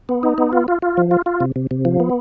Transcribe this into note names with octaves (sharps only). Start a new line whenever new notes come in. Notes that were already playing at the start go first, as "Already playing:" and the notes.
B3
D#4
B3
F4
F4
F4
F3
F4
F4
C3
C3
C3
F3
B3